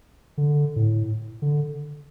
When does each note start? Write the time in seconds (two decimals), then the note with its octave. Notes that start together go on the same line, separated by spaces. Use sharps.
0.38 D3
0.76 A2
1.42 D3